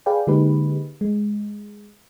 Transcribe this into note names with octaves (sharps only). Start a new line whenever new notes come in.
G#4 B4 D5 F5 G5
D3 G#3 A#3 D#4 G4 B4
G#3